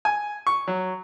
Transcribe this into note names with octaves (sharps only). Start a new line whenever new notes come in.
G#5
C#6
F#3